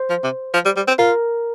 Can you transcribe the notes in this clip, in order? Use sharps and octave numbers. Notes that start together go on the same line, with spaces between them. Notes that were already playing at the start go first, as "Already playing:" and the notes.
Already playing: C5
F3
C3
F3
G3
G3
C4
F4 A#4